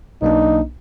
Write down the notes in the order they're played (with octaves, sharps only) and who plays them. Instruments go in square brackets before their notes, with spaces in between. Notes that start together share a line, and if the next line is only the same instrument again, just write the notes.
[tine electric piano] B1 A#3 D4 [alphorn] D#4